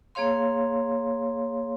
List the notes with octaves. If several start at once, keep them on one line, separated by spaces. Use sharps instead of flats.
A#3 G#4 C#5 F5 C6